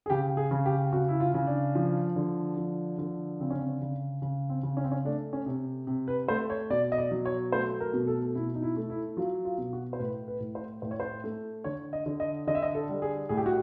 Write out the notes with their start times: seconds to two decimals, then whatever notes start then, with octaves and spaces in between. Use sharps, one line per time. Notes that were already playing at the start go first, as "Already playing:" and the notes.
0.06 G#4
0.10 C#3 G4
0.37 G#4
0.51 C#3
0.66 G4
0.92 C#3 F#4
1.08 E4
1.20 F4
1.34 C#3
1.47 D4
1.75 F3
2.16 D3
2.57 F3
2.99 D3
3.40 C#3 C4
3.50 C#4
3.60 C4
3.81 C#3
4.22 C#3
4.49 C4
4.63 C#3
4.77 C#4
4.84 C4
4.92 C#4
5.05 A3 D4
5.33 C#4
5.46 C3
5.87 C3
6.08 B4
6.28 A3 C5
6.50 C#5
6.70 B2 D5
6.92 D#5
6.98 D5
7.11 F#3
7.25 C#5
7.52 A3 C5
7.80 A#4
7.93 B2
8.07 A4
8.35 B2 E4
8.55 D#4
8.63 E4
8.77 A3
8.90 E4
9.17 F#3 F4
9.45 F4
9.58 B2
9.73 F#4
9.93 C5
9.99 A2 B4
10.28 B4
10.40 A2
10.55 C5
10.82 A2 C5
10.91 C#5
11.00 C5
11.24 A3
11.64 D3 C#5
11.93 D#5
12.06 D3
12.20 D#5
12.47 D3 D#5
12.55 E5
12.62 D#5
12.75 A4
12.89 G3
13.02 G#4
13.29 A2 G#4
13.38 G4
13.46 F#4